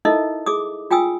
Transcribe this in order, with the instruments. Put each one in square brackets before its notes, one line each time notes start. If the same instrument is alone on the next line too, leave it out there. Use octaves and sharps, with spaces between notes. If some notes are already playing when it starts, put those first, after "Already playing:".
[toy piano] D#4 E4 A4 A#4 D#5 E5
G#4 D6 D#6
F4 G5 G#5 D#6 E6